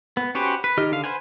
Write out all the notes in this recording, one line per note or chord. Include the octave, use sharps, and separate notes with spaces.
B3
C#4 F#4 G4 B4 C5
B4
D#3 G4 D#5 F6
D3 F5
B4 C5 F#5 G#5